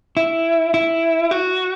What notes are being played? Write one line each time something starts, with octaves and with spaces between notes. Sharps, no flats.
E4
E4
F#4